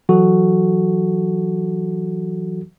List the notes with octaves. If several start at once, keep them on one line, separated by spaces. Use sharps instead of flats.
E3 F#3 F#4 A4